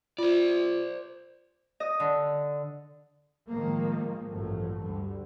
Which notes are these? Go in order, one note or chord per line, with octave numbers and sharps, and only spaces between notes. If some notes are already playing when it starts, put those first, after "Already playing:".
F4 C5 D5
D#5
D3
A2 D#3 F3 G#3 A#3
A1 G2 F3 F#3 A3
D2 G2 D3 G3